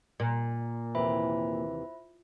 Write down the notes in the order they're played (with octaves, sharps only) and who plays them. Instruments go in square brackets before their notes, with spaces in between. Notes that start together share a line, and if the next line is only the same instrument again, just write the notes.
[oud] A#2
[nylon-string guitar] D#2 C3 E3 [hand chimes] C5 E5 B5